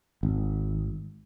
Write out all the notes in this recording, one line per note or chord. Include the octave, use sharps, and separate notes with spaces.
G#1